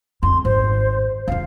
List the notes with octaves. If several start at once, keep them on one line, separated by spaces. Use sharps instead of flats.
F2 C6
G#1 C5
F2 F3 F5